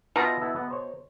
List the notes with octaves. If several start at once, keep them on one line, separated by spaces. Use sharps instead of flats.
B2 D#4 F4 E5 A#5
B3 E4 A4
B3
C5 C#5